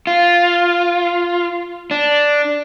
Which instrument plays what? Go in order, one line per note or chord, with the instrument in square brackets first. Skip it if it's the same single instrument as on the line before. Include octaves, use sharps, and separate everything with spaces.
[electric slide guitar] F4
D4